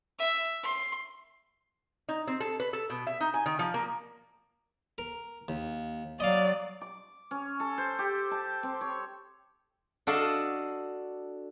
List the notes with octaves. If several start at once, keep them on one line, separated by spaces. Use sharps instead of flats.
E5
C6
D#4
C4
A4
B4
A4
B2
E5
D#4
G#5
D#3
F3
A#3
A#4
D#2
F#3 D5 D#5 F5
D6
C#4
A4
C5
G4
A5
C4
C#5
D4 F#4 A4 D#5 F5 A5